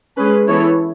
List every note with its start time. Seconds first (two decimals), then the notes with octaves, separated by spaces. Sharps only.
0.17 G#3 C#4 G#4 B4
0.47 E3 B3 E4 A4 C#5